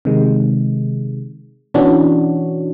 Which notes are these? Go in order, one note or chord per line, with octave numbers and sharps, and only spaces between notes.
C3 D#3 G#3
B2 E3 C#4 D4 F#4